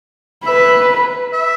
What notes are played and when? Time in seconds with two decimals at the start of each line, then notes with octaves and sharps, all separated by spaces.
0.46 B4 E5
1.33 E5